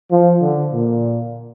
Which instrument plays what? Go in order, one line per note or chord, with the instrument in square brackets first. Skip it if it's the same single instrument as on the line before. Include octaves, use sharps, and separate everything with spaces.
[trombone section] F3
D3
A#2